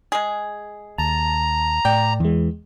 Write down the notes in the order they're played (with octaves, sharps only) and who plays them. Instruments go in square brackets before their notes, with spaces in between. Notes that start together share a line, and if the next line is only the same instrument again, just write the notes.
[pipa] G#3 G#4
[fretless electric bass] D#2 [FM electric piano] A5 [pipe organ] A#5
[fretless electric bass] A2 [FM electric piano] D5 [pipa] G5
[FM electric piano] E2 G#3 [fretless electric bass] E3